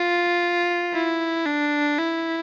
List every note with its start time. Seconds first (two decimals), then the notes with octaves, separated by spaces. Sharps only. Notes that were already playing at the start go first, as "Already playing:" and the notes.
Already playing: F4
0.93 E4
1.46 D4
1.98 E4